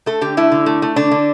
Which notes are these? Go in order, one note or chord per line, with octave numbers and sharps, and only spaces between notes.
A3 A4
D3 G4
A3 E4
D3
A3
A3
D3 D4
D3